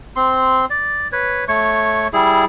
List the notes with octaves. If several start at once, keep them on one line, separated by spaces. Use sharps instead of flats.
C4 C6
D5
B4 C#5
A3 C#5 C#6
G3 E4 G#4